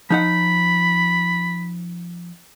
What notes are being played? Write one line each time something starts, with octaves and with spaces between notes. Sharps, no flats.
F3 D#4 F#5 B5